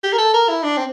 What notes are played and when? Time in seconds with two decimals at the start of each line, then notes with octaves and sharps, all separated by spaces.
0.04 G4
0.13 A#4
0.18 A4
0.34 A#4
0.49 E4
0.63 D4
0.77 C4